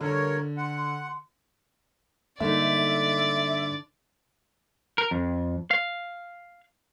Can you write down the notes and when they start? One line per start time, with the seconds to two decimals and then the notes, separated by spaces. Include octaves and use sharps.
0.01 G2 D3 A#4 C#5
0.57 F#5 C6
2.40 G2 D3 G#3 A#3 D#4 D5 E5
4.98 A#4
5.11 F2
5.71 F5